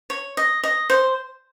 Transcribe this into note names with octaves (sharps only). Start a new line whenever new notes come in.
C#5
D#5
D#5
C5